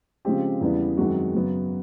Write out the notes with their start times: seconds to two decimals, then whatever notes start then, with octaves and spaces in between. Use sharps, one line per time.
0.25 C#3 F3 G#3 C4 G4
0.61 E2 C#3 E3 G3 B3
0.98 F#2 D#3 G#3 C4 F#4
1.34 F#2 C#3 F#3 B3